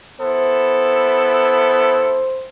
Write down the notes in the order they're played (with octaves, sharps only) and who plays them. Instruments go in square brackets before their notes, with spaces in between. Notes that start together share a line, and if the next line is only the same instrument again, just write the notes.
[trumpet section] B3 E4 A4 [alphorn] C5